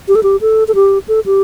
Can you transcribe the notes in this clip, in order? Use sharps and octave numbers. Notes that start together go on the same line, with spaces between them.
G4
A4
G4
A4
A4
G4
A4
G4